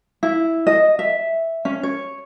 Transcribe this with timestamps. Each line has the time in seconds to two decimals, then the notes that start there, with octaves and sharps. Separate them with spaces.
0.23 E4
0.67 D#5
0.99 E5
1.65 C#4
1.83 C#5